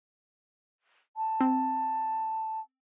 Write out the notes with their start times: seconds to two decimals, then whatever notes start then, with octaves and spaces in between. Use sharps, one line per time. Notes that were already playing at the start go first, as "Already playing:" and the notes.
1.17 A5
1.41 C4